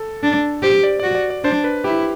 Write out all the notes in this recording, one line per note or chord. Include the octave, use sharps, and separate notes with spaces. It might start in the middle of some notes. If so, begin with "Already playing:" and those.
Already playing: A4
D4
G4 C5
D5
D5
F#4
D5
D5
D4 C5
B4
E4 G4